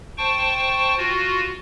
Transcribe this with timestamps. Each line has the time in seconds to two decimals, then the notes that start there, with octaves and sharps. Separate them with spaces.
0.18 C5 G5 A5 C#6
0.97 F4 F#4